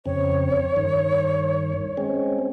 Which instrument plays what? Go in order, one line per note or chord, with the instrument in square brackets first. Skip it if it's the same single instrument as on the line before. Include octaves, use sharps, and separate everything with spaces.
[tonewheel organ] F2 C#3 C4 [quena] C#5
[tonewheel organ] G2 D#3
G#3 C4 C#4